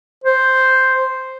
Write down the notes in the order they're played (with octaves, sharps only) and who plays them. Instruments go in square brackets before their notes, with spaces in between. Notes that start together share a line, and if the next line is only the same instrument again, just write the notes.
[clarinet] C5